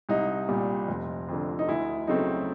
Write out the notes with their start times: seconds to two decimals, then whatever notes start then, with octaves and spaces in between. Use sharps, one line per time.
0.09 C2 D#4
0.49 A#2 G3
0.88 F1
1.29 F2 D3
1.59 D#4
1.68 D2 E4
2.07 C#3 F#3 A3 C4 D#4